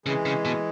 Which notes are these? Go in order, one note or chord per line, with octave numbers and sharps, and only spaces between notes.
C#3 E3 G#3
C#3
B2